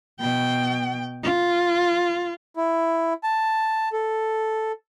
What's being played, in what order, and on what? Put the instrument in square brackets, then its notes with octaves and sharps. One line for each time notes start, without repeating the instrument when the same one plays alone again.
[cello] B2 G5
F4
[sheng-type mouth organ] E4
A5
A4